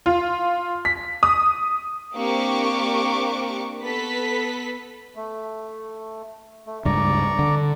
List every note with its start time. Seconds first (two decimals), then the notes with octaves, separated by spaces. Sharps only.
0.06 F4
0.85 B6
1.23 D#6
2.14 A#3 C4 D4 G4 C#6 D6
3.82 B3 A4 B4 B6
5.16 A3
6.67 A3
6.85 C#2 G2 D5 A#5 C#6
7.39 D3